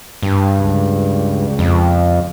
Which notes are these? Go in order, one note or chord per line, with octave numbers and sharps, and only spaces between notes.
G2
C#2
F2